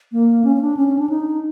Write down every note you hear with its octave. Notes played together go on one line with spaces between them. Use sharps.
A#3
C#4
C#4
D4
C#4
C#4
D4
D#4